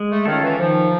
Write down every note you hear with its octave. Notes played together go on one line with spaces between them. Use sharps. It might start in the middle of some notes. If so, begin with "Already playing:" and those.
Already playing: G#3
A3
D#3 C#4 F4 A4
E3
D#3 F3